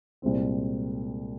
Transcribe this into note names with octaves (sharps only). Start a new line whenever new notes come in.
C2 A#2 G#3 C4